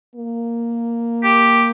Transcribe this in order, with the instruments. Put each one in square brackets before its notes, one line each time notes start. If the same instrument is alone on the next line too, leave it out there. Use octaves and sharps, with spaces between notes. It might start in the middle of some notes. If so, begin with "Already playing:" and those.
[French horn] A#3
[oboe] G4